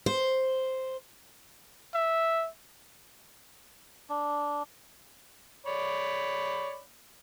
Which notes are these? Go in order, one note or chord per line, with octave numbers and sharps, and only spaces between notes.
C5
E5
D4
C#5 D5 B5